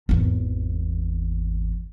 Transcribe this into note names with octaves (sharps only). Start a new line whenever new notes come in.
G#1 E2